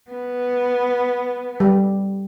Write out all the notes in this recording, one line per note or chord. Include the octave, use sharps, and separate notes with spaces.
B3
G3